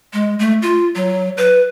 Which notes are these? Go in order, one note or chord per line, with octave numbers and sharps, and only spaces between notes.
G#3
A3
F4
F#3
B4